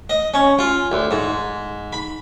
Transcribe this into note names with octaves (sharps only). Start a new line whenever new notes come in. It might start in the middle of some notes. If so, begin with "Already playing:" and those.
D#5
C#4
F4
D2
G#2
B5